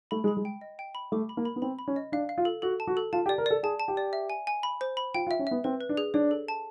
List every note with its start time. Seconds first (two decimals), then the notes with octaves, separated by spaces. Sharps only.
0.11 A3 B5
0.24 G#3
0.28 B5
0.37 G#3
0.45 G5
0.61 D#5
0.79 G5
0.95 B5
1.12 A3 D6
1.29 B5
1.37 A#3
1.45 B5
1.56 B3
1.62 C4 B5
1.79 B5
1.88 C#4
1.96 D#5
2.12 D4 F5
2.29 F5
2.38 F4
2.45 A4
2.62 F#4 A4
2.80 A5
2.87 F#4
2.97 A4
3.13 F4 A5
3.26 G4
3.29 D5
3.38 A#4
3.46 A4 D5
3.63 G#4 A5
3.80 A5
3.88 G4
3.97 D5
4.13 E5
4.30 G#5
4.47 G#5
4.63 B5
4.81 C5
4.97 B5
5.14 F4 G5
5.27 F4
5.31 E5
5.39 C#4
5.47 B3 E5
5.64 C4 B4
5.81 B4
5.89 D4
5.97 G#4
6.14 D4 C#5
6.31 A4
6.48 A5